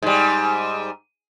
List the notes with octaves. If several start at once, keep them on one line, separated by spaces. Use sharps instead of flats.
G#2 G3